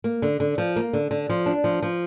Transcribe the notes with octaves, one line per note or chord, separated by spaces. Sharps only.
A#3
D3
D3
F3
A#3
D3
D3
F3
D4
F3
F3